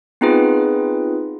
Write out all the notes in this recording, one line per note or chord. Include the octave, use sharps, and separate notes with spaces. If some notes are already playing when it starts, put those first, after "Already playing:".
B3 C4 D#4 F4 G#4 B4